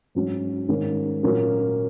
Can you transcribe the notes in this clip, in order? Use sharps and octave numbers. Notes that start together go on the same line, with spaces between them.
G#2 F#3 C#4
G#2 D#3 A#3 C#4
A#2 F#3 A#3 C#4 F#4